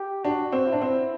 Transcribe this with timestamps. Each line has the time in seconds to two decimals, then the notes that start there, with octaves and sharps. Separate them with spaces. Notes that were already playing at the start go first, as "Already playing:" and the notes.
Already playing: G4
0.24 D4 F#4
0.52 C4
0.67 E4
0.73 D4
0.81 C4